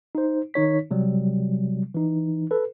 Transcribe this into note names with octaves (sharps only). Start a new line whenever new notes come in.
D#4 C5
D#3 D#4 C#5 B6
C3 F#3 G3
E3 D#4
A4 B4